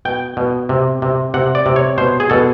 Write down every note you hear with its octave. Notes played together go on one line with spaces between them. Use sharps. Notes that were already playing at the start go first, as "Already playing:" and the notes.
B2 G5
B2
C3
C3
C3 F#5
D5
C3
C#5
B2 C5
G#4
B2 A4